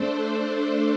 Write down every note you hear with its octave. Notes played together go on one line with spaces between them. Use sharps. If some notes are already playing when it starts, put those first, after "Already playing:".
Already playing: A3 D4 A4 C5